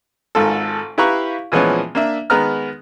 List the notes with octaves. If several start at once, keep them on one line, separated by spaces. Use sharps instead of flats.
G#1 G#2 F4 A4
E4 G4 B4 F5 A#5 C#6
A#2 E3 F3 G#3 B3 C#4
A#3 D4 E5
D#3 G#3 B3 B4 A#5 F6